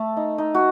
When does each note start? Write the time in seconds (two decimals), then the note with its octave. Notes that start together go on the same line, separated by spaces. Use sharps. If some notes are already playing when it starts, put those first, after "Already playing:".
Already playing: A3 A4
0.17 D#4
0.38 D#4
0.54 F#4